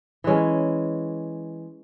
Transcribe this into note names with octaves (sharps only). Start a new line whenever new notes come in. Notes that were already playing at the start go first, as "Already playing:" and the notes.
E3 G#3 C#4